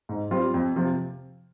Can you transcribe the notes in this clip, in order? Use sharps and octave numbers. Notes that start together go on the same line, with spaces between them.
G#2
G3 C4 F4
F2
C3 F3